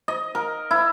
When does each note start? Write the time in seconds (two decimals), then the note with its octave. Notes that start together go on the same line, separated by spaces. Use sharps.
0.08 D#5
0.35 A#4
0.71 E4